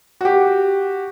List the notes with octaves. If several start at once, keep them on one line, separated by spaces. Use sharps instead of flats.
F#4 G4